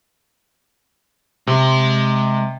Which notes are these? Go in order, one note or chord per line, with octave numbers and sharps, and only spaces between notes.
C3 G#3 C6